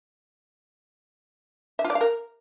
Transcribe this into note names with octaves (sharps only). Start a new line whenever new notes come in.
E5
F4
D5
F5
A#4